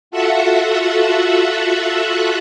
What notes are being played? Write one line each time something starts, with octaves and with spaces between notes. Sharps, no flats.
F4 F#4 A4 E5 F#5